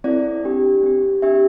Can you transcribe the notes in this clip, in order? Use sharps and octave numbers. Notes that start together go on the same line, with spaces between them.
C4 E4 A4 D5
D4 G4
C4 G4
D4 G4 E5